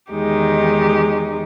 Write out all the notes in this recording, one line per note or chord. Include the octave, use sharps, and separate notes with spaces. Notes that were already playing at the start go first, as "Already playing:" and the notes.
E2 D#3 G#3 D#4 G4